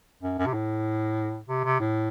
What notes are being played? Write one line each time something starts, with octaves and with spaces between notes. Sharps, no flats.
F#2
F#2
C3
A2
C3
C3
A2